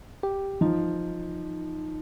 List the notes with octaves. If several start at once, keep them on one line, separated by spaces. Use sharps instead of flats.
G4
F3 D#4